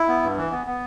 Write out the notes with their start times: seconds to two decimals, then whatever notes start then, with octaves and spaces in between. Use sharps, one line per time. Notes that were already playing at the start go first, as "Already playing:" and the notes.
Already playing: E4
0.08 B3
0.23 G2
0.38 E3
0.52 B3
0.67 B3